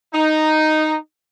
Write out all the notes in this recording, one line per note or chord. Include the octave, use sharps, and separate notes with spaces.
D#4